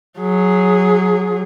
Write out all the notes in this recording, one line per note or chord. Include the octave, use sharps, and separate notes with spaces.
F#3 G#4